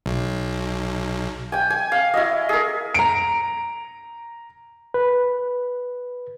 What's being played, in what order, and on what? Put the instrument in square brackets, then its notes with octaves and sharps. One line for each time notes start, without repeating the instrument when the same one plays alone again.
[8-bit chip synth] B1
[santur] G5 G#5
G#5
F5
E4 F#4 D#5
G#4 A#4
[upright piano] A#5 D7
[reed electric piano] B4